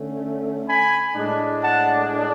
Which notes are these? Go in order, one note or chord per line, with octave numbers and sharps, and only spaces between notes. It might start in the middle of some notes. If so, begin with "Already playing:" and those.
Already playing: D3 A3 C#4
G#5 B5
A2 G#3 D4
F#5 A5